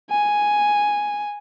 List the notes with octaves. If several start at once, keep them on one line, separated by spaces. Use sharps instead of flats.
G#5